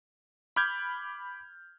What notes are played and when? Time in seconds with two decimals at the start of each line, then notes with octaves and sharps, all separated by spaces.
0.56 B5 D6 F6 G6 G#6